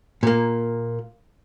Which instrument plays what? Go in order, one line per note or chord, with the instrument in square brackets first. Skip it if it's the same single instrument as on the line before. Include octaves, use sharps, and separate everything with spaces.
[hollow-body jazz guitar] A#2 A#3